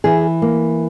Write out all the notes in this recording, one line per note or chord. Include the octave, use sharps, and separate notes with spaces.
E3 G#4
A#3